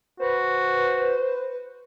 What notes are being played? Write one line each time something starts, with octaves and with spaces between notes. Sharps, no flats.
F#4 B4 C5